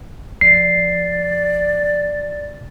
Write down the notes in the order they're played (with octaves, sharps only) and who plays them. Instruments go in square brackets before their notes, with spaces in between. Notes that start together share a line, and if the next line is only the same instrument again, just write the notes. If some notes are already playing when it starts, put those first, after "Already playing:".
[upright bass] F3 [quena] D5 [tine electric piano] C7